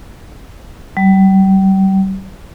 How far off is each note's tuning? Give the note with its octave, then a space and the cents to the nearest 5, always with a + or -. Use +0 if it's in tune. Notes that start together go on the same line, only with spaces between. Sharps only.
G3 -35